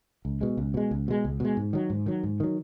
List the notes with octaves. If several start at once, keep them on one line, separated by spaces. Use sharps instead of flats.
C#2
B2 G#3
C#2
B2 G#3
C#2
B2 G#3
C#2
B2 G#3
G#2
D#3 F#3
G#2
D#3 F#3
G#2
D#3 F#3